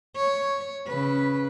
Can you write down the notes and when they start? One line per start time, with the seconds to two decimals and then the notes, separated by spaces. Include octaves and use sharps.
0.16 C#5
0.88 C#3 B4